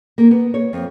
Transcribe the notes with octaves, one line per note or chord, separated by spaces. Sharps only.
A#3
B3
C#5
F2